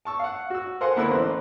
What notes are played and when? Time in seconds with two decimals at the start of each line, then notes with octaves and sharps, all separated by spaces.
0.05 A5 C#6 E6
0.19 F5 F#5
0.50 F#4 E6
0.81 A4 A#4 C5 F5 F#5 G#5
0.96 D3 A#3 B3 E4 B4 E6
1.11 A1 C5